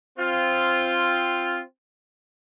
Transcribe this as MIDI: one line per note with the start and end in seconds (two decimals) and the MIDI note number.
0.18 1.62 60
0.18 1.62 65